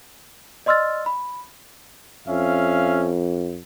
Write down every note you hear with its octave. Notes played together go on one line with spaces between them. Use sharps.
D5 D#5 C6 E6 F6 A6
B5
F2 C#4 E5 F5